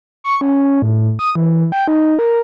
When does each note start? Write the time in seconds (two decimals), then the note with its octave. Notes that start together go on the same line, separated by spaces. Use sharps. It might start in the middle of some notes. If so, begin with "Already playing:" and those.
0.24 C#6
0.41 C#4
0.82 A2
1.19 D#6
1.35 E3
1.72 G5
1.88 D#4
2.19 A#4